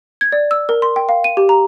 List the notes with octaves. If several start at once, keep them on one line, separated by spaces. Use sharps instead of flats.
G#6
D5
E6
A#4
C6
G5
F5
D#7
G4
A#5